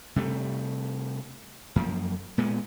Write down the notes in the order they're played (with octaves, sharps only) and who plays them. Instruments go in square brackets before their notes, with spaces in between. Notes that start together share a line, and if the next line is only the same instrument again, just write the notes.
[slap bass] C3 G3 A3
F#2 F3 A#3
A#2 G#3 B3